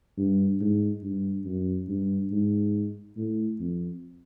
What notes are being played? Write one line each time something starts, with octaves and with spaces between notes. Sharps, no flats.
G2
G#2
G2
F#2
G2
G#2
A2
F2